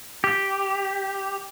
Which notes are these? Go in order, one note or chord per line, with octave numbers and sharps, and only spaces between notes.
G4